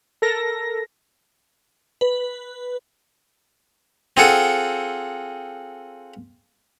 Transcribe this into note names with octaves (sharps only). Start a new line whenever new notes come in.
A4 A#4 A#6
B4
C4 F4 G#4 A4 F#5